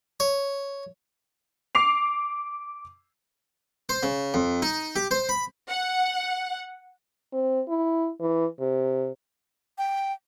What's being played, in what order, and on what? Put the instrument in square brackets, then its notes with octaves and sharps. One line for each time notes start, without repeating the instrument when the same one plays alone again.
[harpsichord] C#5
[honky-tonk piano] D6 C7 F7
[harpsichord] C5
C#3
F2
D#4
G4
C5
B5
[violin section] F#5
[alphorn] C4
E4
E3
C3
[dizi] G5